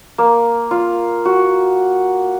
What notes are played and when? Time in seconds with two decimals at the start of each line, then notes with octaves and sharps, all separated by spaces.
0.18 A#3
0.71 F4
1.25 F#4